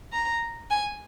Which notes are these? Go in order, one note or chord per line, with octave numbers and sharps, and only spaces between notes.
A#5
G#5